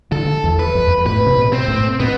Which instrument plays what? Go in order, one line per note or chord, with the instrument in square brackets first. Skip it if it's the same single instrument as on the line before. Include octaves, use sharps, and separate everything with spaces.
[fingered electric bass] D3 [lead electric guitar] A4
[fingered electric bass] E2
[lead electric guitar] B4
[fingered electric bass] F2
[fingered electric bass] A2 [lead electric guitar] B4
[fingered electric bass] C3
B2
[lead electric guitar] C4
[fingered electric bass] A2
[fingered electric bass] B2 [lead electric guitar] B3